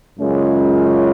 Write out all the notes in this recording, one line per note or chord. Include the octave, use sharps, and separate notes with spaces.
F#2 C#3 G#3 C#4 F4